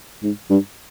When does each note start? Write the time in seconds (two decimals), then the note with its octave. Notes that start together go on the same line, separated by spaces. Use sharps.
0.23 G#2
0.50 G2